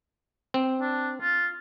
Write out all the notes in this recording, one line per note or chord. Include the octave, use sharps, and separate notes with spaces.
C4
D4
F4